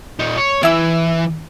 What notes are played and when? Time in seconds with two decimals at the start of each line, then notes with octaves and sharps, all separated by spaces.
0.20 A#2 D#4
0.38 C#5
0.63 E3 E4 E6